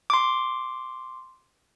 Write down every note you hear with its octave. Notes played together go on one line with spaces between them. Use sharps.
C6 D6